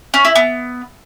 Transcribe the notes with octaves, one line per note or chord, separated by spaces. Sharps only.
C#4
E4
B3